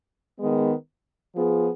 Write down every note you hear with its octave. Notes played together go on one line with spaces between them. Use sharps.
D#3 G#3 B3
F3 B3 F4 G#4